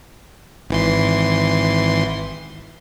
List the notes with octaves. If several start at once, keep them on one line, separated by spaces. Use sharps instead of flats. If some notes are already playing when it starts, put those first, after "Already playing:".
G#1 E3 C6